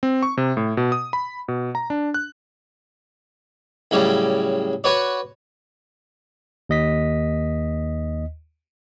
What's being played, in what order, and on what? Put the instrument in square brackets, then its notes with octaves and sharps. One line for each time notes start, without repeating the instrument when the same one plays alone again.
[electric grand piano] C4
C#6
C3
A2
B2
D#6
B5
B2
A#5
D4
F#6
[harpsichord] A2 C#3 F#3 G3 D5
F#4 B4 C#5 D5
[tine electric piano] D#2 D#5 B6